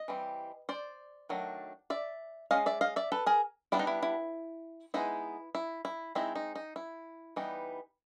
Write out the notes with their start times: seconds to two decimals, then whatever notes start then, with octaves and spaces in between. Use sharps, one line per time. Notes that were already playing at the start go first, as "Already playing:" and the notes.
Already playing: D#5
0.08 E3 G3 C4
0.69 C5 D5
1.29 D#3 F#3 A3 D4
1.90 D5 E5
2.51 G#3 C#4 D#5 F5
2.66 D5 E5
2.81 D#5 F5
2.96 D5 E5
3.12 A4 B4
3.26 G#4 A#4
3.72 G3 B3 D4 E4
3.79 D#4
3.87 E4
4.03 E4
4.94 G#3 B3 D#4 E4
5.55 E4
5.85 E4
6.15 G#3 C4 D#4 E4
6.35 D#4
6.55 D#4
6.76 E4
7.36 E3 G3 B3 D#4